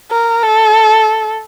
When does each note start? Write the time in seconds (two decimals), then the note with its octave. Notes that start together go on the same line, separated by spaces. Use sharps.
0.11 A#4
0.43 A4